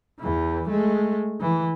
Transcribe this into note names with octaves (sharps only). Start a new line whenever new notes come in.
E2 E3
G#3 A3
E3